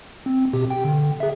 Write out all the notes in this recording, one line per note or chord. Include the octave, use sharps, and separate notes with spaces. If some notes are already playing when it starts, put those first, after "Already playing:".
C4
B2 G4
G5
D3
G#4 E5